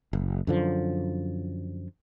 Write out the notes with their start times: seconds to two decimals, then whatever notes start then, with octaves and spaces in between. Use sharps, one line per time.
0.13 F#1
0.47 F#2 D3 F3